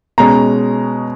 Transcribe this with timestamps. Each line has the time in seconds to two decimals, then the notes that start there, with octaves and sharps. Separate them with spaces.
0.18 B2 G#3 C#4 A#5